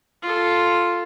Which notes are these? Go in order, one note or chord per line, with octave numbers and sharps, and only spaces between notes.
F4 A4